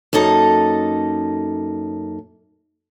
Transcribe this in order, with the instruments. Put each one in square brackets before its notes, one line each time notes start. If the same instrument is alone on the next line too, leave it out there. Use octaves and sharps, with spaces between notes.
[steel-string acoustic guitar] F#2 A#3 D#4 A4 D#5